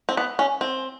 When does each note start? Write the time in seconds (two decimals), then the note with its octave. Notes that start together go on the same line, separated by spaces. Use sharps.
0.09 C4
0.17 B3
0.39 C#4
0.61 C4